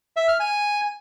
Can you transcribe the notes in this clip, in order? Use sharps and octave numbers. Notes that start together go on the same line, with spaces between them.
E5
F6
G#5